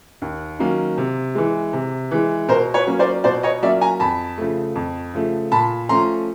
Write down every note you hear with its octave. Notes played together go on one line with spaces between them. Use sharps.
D#2
D#3 F#3 A#3 C#4
C3
E3 G#3
C3
E3 G#3
B2 A#4 C5
B4 C#5
F#3 A#3 C#4
C5 D5
B2 C5 D5
C#5 D#5
F#3 A#3 C#4 D5 E5
G#5 A#5
F2 A5 B5
C#3 F3 A3
F2
C#3 F3 A3
A#2 A5 B5
F3 A3 C#4 A#5 C6